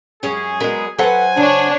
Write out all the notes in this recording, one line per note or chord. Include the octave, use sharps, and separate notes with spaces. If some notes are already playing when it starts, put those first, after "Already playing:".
F#2 G#3 C#4 G#4
F#3 G#3 B3 A#4
F#3 A4 B4 C5 F#5 G#5
C#3 D4 C#5